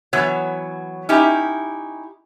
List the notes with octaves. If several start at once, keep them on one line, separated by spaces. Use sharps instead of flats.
E3 F#3 B3 C#5
C#4 D#4 E4 G4